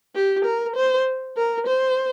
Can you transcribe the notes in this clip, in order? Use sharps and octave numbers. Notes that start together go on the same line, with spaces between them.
G4
A#4
C5
A#4
C5